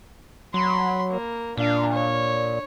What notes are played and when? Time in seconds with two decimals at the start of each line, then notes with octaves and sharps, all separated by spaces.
0.54 F#3 B5 C6
1.09 A#3
1.57 A#2 D4 F5
1.92 C#5